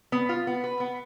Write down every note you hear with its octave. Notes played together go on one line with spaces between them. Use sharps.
B3
F4
B3
B4
B3